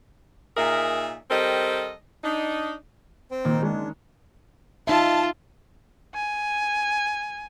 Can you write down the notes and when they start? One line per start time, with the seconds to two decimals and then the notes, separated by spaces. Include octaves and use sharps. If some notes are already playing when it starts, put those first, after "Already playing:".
0.56 A#2 D#4 G#4 A#4 E5
1.30 G3 C4 A4 A#4 D#5
2.23 D4 D#4
3.31 C4 C5 G5
3.45 A#2 D#3
3.62 G#3 C#4 D4
4.87 D#4 F4 E5 A5
6.14 G#5